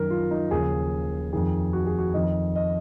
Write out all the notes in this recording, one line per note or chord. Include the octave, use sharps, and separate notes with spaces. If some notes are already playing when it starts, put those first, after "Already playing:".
Already playing: F#2 D#3 A#4
F4
D#4
D#2 C#3 F3 G#4
F2 D#3 G#4
F#4
G#4
F#4
F2 D#3 D#5
D#5